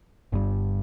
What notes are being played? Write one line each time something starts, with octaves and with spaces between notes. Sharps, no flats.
G1 G2 G3